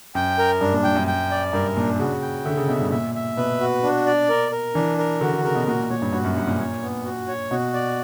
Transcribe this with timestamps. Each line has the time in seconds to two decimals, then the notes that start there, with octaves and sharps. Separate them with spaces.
0.15 F#2 G5
0.38 A#4
0.61 G2 D4
0.73 A#2
0.84 G2 G5
0.95 F#2
1.07 G5
1.31 D5
1.53 G2 A#4
1.76 A#2 D4
1.99 C#3 F#4
2.22 G5
2.45 D3 E5
2.57 C#3
2.68 B2 E5
2.80 G2
2.91 A#2 E5
3.15 E5
3.37 B2 B4
3.61 F#4
3.83 D4
4.06 D5
4.29 A#4
4.52 A#4
4.75 E3 D4
4.98 A#4
5.21 D3 F#4
5.33 D3
5.44 C#3 A#4
5.55 B2
5.67 A#2 F#4
5.79 A#2
5.90 A#2 C#5
6.02 G2
6.13 G2 F#4
6.25 F#2
6.36 G2 F#5
6.47 A#2
6.59 A#2 C#5
6.82 B3
7.05 F#4
7.28 C#5
7.51 B2 F#4
7.74 D5